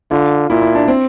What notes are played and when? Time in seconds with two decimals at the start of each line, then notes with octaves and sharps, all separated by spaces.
0.11 D3 F4
0.50 A#2 E4
0.62 E4
0.75 D4
0.88 C4